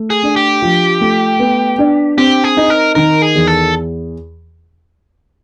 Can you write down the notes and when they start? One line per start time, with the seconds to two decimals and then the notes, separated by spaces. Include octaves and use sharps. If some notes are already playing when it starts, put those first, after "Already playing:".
Already playing: A3
0.10 G#4
0.23 D4
0.36 G4
0.62 F3
1.01 A3
1.39 B3
1.79 D4
2.18 C4 G4
2.44 G#4
2.57 D#4
2.70 A#4
2.95 D#3 A#4
3.22 G#4
3.35 E2
3.47 A4